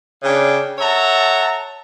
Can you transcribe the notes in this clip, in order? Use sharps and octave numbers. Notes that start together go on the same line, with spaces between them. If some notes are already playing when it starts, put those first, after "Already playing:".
C#3 D4 G5
A4 C#5 E5 F#5 A5 A#5